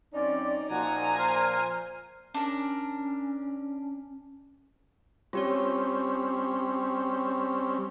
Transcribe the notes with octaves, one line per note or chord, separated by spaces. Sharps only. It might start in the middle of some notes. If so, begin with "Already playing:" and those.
F#2 C4 C#4 D#4 D5
A#2 F3 F#4 G#5 A#5
C5 F6
C#4 D4 A#4
G3 C4 C#4 F4 G4 C#5